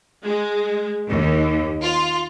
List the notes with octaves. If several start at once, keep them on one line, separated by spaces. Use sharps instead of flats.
G#3
D#2
F4